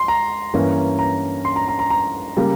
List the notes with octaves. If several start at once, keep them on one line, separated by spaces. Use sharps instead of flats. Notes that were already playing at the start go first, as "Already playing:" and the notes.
Already playing: C6
A#5
G2 E3 A#3 C#4
A#5
C6
A#5
A#5
A#5
A#5
C#3 G3 A#3